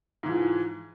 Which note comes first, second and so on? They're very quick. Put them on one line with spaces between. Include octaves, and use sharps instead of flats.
G#2 E3 F3